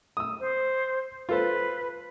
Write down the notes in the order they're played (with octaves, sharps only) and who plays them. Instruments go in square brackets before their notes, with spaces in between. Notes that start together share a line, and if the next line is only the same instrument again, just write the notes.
[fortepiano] D#6 E6
[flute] C5
[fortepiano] F4 A4 C5 [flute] B4